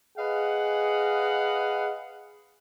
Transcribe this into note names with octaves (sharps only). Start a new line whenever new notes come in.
G#4 B4 D#5 F5 F#5